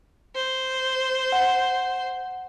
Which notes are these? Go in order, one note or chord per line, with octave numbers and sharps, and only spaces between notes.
C5
F#5